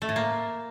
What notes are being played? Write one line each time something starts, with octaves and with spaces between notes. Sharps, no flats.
A3
A2
A#3